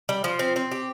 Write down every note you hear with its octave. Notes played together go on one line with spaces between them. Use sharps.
G3
F3
C4
C4
G4